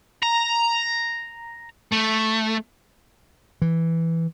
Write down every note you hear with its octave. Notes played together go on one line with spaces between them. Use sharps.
A#5
A3
E3